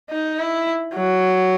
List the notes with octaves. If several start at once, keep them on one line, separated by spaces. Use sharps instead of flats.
D#4
E4
F#3